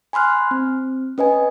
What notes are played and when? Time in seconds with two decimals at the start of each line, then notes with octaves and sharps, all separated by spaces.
0.13 G#5 B5 C6 F6 F#6
0.51 C4
1.18 C#4 B4 D#5 G#5